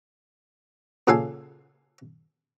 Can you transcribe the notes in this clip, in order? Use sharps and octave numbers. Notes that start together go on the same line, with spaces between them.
A#2 C#3 F4 A4 F5 G#5